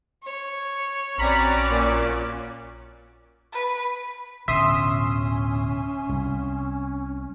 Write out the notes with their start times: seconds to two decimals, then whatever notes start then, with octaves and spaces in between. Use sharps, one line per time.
0.24 C#5
1.18 A#1 C4 C#4 F#4 D5 A#5 B5
1.69 A#2
3.53 B4
4.48 D1 B2 D3 C#4 E5 C6 D#6
6.09 C2